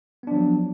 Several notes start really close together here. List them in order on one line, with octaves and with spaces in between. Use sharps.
B3 D4 F3 F#3